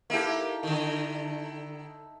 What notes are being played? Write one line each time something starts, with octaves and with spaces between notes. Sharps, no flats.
A#3 D#4 E4 G4 A4
D3 D#3